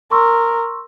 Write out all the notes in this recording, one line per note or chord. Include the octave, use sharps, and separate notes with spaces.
A#4 C6 C#6 E6